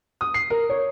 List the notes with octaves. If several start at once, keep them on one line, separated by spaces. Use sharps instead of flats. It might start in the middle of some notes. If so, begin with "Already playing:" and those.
D#6
C7
A#4
C#5